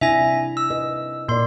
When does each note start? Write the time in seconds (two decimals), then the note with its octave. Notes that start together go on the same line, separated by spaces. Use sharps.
0.01 C3 D4 E4 E5 G#5 A#6
0.57 E6
0.71 B4 D#5
1.28 A#2 A#3 D5 C6